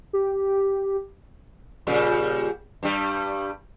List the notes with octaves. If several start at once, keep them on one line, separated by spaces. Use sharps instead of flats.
G4
A#2 C#3 G3
G2 G3